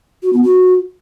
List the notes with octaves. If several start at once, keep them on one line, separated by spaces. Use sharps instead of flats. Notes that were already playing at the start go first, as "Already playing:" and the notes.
F#4
B3
F#4